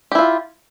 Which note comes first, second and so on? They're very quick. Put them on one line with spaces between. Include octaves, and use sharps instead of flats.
G4 E4 F4